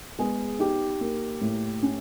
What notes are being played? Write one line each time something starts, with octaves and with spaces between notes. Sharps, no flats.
G#3 B3 G#4
D#4 G4
A#3
A2
C#4